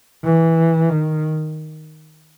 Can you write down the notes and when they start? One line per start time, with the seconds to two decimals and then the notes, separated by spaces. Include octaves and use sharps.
0.24 E3
0.90 D#3